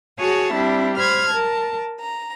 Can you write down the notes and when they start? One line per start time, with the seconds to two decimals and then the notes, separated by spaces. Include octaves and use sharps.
0.18 F#4 G#4 C#5 G#5 A5
0.52 G3 C4 D4 E4
0.97 C5 B5 F6 G#6
1.28 A#4 A5
2.00 A#5